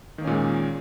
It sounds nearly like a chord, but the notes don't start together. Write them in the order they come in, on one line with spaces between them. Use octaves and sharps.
D#3 A#3 C#4 A#2 G#3